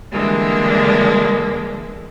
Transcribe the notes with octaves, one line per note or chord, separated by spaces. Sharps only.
D3 E3 G3 G#3 A#3 D4